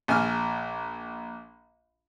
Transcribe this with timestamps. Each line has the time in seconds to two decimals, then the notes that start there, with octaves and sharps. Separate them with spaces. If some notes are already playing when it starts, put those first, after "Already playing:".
0.08 A#1 G#5 F6